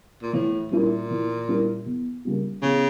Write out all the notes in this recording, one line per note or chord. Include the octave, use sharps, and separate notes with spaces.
A#2
A2 E3
A#2 G3 C#4 E4 A#4
E3
G3 C#4 E4 A#4
E2
C#3 G3 A#3
E2 C#3